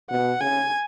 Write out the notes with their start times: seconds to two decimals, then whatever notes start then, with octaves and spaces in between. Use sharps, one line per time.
0.10 B2 F#5
0.40 C#3 G#5